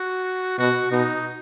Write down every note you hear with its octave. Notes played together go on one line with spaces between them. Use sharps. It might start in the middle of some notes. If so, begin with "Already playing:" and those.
Already playing: F#4
B2 F#4
B2 D#4